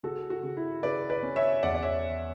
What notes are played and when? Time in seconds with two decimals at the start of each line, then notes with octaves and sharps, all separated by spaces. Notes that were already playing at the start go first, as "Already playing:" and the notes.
0.03 C#3 F#4 A4
0.30 F#4
0.43 C#3
0.57 E4
0.83 C#3 B4 D5
1.10 B4 D5
1.23 C#4
1.36 C#5 E5
1.63 E2 D5 F#5
1.75 D5
1.82 C#5 E5